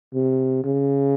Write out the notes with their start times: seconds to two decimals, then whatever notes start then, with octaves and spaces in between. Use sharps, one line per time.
0.14 C3
0.65 C#3